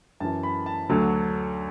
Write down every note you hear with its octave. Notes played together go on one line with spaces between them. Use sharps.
F#2 E3 A5
B5
A5
D2 D3 F#3